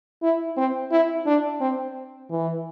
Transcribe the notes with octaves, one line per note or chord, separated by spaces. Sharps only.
E4
C4
E4
D4
C4
E3